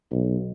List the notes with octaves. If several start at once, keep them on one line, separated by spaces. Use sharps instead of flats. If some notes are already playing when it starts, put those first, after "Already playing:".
B1